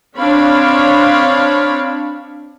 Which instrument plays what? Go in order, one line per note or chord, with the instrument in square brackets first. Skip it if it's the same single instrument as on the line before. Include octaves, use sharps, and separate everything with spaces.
[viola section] C4 D4 C#5 F5 B5